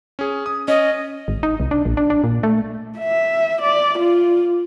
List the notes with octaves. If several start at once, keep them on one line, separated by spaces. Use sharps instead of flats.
C#4 G#4
D#6
C#4 D#5
G#1
D#4
C2
D4
A#1
D4
D4
A#2
A3
E5
D5
F4